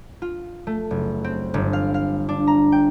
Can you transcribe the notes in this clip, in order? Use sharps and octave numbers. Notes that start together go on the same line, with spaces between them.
F4
A3
F#1
C4
G1
F5
F5
D4
A#5
G5